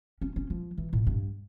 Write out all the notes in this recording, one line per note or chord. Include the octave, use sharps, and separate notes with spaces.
C#4
C#4
F3
E3
A2
G2